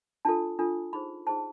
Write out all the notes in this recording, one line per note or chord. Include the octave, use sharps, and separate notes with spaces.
D4 F4 A4 A5
D4 F4 A4
D#4 G#4 C5 B5
D#4 G#4 C5 A5